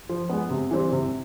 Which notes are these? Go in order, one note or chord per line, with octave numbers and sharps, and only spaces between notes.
F3
G#3 B3
C3
E3 G3 C4
C3